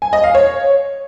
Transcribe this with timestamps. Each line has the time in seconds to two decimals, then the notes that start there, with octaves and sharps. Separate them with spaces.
0.02 G#5
0.13 D#5
0.24 F5
0.35 C#5